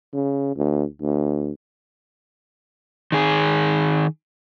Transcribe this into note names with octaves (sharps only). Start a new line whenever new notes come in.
C#3
D2
D2
D#3 G#4